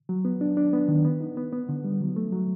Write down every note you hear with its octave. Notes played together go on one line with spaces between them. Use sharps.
F#3
B3
D4
D4
B3
D#3
B3
D#4
B3
B3
D3
G3
F#3
A3
F#3